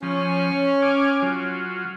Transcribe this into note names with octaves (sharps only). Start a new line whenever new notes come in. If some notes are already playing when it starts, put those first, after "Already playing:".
F3 C#4
G#5 D6 F6
F#3 F4